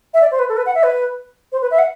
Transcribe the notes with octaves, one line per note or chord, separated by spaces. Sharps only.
E5
D5
C5
B4
A4
B4
F#5
E5
B4
C5
B4
E5
F#5